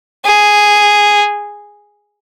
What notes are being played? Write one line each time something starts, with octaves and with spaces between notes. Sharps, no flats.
G#4